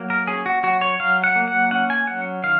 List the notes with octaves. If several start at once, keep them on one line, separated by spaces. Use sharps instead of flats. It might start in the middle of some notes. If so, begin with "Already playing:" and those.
Already playing: F#3 A#3
A#4
C#4 G#4
F#4
F#3 F#4
C#5
F#3 F5
F#5
A#3
F#5
C#4 F#5
G#5
F#3 F#5
D#3 F5